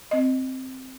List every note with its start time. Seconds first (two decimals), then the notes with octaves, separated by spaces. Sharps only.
0.11 C4 D#5